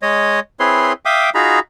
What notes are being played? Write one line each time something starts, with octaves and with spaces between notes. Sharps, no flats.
G#3 C#5 D#5
C4 E4 G#4 B4 C#5 C6
E5 F5 G5 D6 D#6
D#4 F4 F#4 G#4 A#5 B5